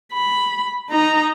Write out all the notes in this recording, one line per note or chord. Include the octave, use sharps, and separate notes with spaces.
B5
D#4 A#5